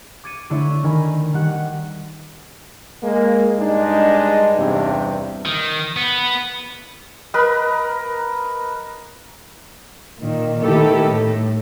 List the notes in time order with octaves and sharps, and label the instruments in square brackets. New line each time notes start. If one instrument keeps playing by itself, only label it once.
[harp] D6 G#6 A6 C#7 D#7
D3 A3 D4 E4 A4 C#5
D#3 A#4 G#5 A#5 B5
D#3 G3 F#5 F#6 C#7
[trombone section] G#3 A#3
G2 G#3 D4 D#4
E2 G2 C3
[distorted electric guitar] D#3
B3
[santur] A#4 B4 D#5 B5
[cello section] A#2 D#3
D#3 A3 B3 E4 G4 A4
A2